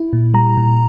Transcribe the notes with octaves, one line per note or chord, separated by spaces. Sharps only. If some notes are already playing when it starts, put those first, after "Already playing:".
Already playing: E4
A#2
G3 A#5
A#2